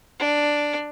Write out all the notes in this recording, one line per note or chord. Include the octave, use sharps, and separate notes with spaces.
D4